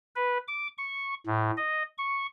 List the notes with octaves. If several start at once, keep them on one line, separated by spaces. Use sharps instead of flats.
B4
D6
C#6
A2
D#5
C#6